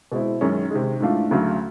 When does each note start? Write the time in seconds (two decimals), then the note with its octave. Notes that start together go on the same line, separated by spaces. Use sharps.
0.12 B2 G#3 C4 E4
0.41 F#2 D#3 G#3 C#4
0.71 C3 D#3 G#3
1.00 G#2 E3 A3 D4 F4
1.31 D2 C#3 F#3 A3